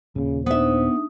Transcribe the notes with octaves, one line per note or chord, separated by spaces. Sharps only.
D#1 A#2 C#3
B3 D4 D#4 C5 E5 D#6